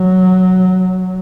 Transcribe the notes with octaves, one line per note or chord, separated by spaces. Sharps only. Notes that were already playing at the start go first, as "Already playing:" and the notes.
Already playing: F#3